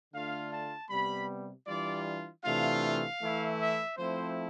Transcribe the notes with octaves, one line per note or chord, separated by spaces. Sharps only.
D3 A3 D4 F4 F5
A5
C3 G3 B3 B5
E3 G3 D4 F4 D5
C3 E3 A3 D4 F4 F5
F5
E3 A3 E4
E5
F3 A3 C4 E4 C5